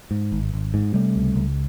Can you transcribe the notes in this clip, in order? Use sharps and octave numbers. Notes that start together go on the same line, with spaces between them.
G#2
G#1
G#1
G#2
C3 G3 A3
C#2
C#2